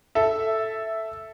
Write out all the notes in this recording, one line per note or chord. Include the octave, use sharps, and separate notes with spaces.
A4 E5